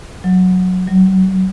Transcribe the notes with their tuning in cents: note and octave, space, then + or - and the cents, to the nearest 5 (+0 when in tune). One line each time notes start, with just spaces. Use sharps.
F#3 -10
F#3 +35